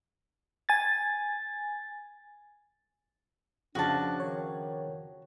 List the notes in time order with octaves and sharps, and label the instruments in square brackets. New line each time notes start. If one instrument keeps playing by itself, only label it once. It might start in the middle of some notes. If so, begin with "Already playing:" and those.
[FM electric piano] G#5 A6
[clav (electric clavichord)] F2 C#3 F3 [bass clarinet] D4 [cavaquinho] F#4 A5
[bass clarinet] D#3 [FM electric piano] C#5